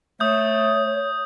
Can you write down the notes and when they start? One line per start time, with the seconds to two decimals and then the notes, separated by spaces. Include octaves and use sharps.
0.20 A3 C#5 D#6 G6